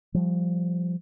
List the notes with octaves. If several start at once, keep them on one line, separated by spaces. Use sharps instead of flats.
F3 G3